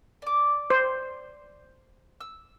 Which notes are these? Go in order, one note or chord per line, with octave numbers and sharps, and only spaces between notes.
D5 D6
C5
E6